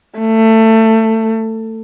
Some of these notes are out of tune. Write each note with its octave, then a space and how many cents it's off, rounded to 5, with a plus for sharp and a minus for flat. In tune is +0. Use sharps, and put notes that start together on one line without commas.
A3 +20